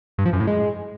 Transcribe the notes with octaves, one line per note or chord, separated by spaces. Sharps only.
G2
F3
F#2
A2
G#3